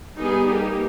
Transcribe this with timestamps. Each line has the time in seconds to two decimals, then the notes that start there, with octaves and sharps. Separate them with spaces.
0.18 G3 B3 D#4 G#4
0.47 A#3 D#4 G4